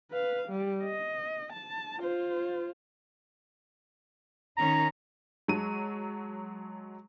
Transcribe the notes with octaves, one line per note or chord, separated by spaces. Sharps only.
B4 F5
G3
D#5
A5
F4 C5
D#3 C#4 D#4 A#5
F#3 G#3 A5 D#7